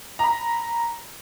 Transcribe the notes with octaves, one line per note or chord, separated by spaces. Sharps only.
A#5 B5